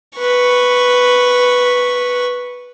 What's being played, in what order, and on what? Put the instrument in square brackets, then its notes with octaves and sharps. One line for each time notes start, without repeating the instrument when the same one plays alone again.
[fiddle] B4 C#6